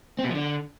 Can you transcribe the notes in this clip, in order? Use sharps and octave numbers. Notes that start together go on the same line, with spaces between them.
C4
B2
F3
D3